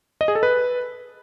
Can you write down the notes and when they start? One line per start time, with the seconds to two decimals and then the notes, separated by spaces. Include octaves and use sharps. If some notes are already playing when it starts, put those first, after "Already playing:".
0.21 D#5
0.28 G#4
0.35 A4
0.43 B4